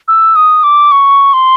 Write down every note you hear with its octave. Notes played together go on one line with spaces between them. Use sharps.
E6
D#6
D6
C#6
C6